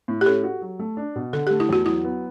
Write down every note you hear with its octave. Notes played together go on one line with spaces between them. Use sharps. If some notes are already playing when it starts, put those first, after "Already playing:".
A2
G4
C#4 A4
F#4
F#3
A3
D4
B2
D3 A4
G4
A3
E4
E2 F#4
F#3 E4
B3